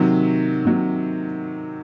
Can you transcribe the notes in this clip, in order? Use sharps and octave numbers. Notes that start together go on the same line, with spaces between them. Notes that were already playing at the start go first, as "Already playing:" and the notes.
Already playing: C3 D#3 F#3
C3 D#3 F#3